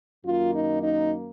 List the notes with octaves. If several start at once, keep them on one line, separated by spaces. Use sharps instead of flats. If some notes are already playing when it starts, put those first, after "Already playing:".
F#2 D#3 A#3 F4
D#4
D#4